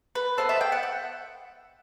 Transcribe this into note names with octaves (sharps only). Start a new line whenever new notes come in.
B4
B3 E4 A4 C5
E5
G5
F#5
F#5